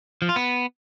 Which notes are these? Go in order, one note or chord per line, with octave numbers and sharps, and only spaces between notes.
F3
F4
B3